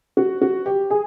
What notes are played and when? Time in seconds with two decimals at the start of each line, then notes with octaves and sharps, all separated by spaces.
0.17 F#4
0.41 F#4
0.66 G4
0.90 G#4